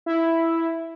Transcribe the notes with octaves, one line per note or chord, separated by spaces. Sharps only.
E4